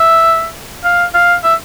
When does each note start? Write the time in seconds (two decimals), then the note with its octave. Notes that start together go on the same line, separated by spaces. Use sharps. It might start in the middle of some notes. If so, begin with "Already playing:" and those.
Already playing: E5
0.84 F5
1.14 F5
1.44 E5